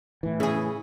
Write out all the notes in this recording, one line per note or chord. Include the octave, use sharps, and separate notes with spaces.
A2 E3
C#3 E4 G#4